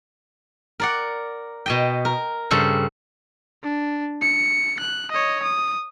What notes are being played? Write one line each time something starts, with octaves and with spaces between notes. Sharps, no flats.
A#4 D5 F#5
B2 D#5 G5
A#4
G2 C#3 A4 C5
D4
C#7
F#6
C#5 D#5
D#6